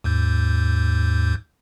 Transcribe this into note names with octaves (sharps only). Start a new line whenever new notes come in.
D#2 G#2 G6